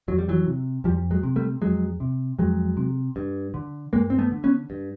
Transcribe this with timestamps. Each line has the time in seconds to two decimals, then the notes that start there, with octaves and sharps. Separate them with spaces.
0.08 F2 F#3
0.18 G3
0.29 E3 F#3
0.46 C3
0.84 F2 F3 G3
1.11 F#3 G#3
1.23 C3
1.36 G3 A3
1.62 F2 F#3 G#3
2.00 C3
2.39 F2 F#3 G#3
2.77 C3
3.16 G2
3.54 D3
3.93 G2 G#3 A#3
4.10 C4
4.18 A3 B3
4.31 D3
4.44 B3 C#4
4.70 G2